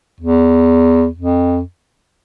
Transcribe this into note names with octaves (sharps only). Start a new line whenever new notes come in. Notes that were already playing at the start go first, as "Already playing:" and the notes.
E2
F2